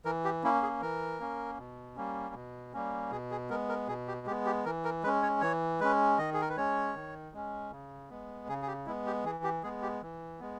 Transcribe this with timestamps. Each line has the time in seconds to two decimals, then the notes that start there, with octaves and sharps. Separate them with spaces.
0.05 E3 A#4
0.24 G4
0.43 A#3 C#4 E4
0.63 G#4
0.81 E3 A#4
1.20 A#3 C#4
1.58 B2
1.96 G3 A#3 C#4
2.35 B2
2.73 G3 A#3 C#4
3.11 B2 G#4
3.31 G#4
3.50 G#3 B3 A#4
3.69 A#4
3.88 B2 G#4
4.08 G4
4.26 G#3 G4
4.30 B3
4.46 G4
4.65 E3 A#4
4.84 A#4
5.03 G#3 B4
5.06 C#4
5.22 C#5
5.41 E3 C#5
5.80 G#3 C#4 B4
6.18 D#3 D#5
6.34 G#4
6.41 A#4
6.49 B4
6.57 G#3 C#4 C#5
6.95 D#3
7.33 G#3 C#4
7.71 C#3
8.10 G#3 B3
8.48 C#3 G#4
8.62 G#4
8.67 G4
8.86 G#3 B3 E4
9.06 G4
9.24 E3 G#4
9.44 G4
9.63 G#3 B3 G#4
9.82 G4
10.02 E3
10.40 G#3 B3